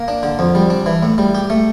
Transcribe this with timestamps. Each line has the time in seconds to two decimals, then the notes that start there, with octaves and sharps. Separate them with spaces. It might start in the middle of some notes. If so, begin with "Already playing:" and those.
Already playing: A#3
0.08 D4
0.23 D3
0.39 F2
0.55 G3
0.70 D4
0.86 E3
1.03 A2
1.18 G3
1.35 G4
1.50 A3